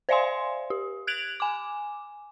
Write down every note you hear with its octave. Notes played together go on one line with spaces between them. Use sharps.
C5 D5 E5 F5 G#5 C6
G4
F#6 G#6 D7 F7 F#7
G#5 D6